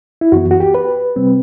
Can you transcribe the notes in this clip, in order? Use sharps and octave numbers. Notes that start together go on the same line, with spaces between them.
E4
F#2 E3 B3 F#4
F#4
G4
B4
C3 G3 C4